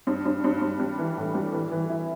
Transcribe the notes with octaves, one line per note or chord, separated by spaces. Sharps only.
G2
G2
G2
G2
G3
E3
A2
G3
E3
E3
E4